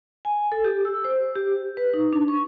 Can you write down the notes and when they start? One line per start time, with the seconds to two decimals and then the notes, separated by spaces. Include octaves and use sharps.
0.25 G#5
0.52 A4
0.64 G4
0.85 E6
1.05 C5
1.35 G4
1.77 B4
1.94 D#4
2.13 D4
2.28 C#6